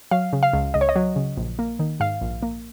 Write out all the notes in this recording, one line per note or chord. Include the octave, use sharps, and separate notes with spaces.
F#3 F5
C#3
F5
C#2
C#2 D#5
C#5
D#5
F#3
C#3
A#1
A#3
D#3
G#2 F5
A#1
A#3